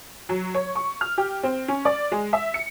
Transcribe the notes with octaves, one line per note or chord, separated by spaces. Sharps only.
F#3
C#5
C#6
F6
G4
C4
C#4
D5
G#3
E5
C#7